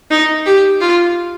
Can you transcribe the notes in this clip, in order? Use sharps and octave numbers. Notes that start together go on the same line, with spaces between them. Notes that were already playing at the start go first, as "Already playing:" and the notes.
D#4
G4
F4